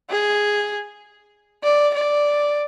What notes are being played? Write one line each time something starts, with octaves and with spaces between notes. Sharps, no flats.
G#4
D5
D5